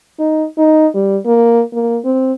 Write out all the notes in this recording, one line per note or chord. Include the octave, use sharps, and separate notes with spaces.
D#4
D#4
G3
A#3
A#3
C4